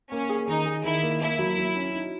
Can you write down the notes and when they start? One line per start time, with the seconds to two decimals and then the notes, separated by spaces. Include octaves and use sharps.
0.11 A#3 C#4
0.29 G#4
0.47 D#3 D#4
0.65 G#4
0.84 D#3 E4
1.03 A#3
1.21 A#3 E4
1.39 F#3
1.58 F#3
1.76 C#4
1.93 D#4